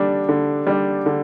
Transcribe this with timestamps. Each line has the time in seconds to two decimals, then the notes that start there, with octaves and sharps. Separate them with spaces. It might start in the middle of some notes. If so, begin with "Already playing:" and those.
Already playing: D3 G3 D4
0.29 D3
0.67 G3 D4
1.06 D3